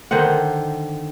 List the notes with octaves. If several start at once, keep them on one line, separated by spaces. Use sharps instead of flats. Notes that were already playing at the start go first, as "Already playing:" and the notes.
D3 D#3 C5 F#5